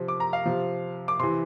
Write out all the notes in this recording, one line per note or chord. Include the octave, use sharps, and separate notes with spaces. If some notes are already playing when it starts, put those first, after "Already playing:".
Already playing: C3 F3
D6
A#5
F5
C3 F3
D6
C3 E3 C6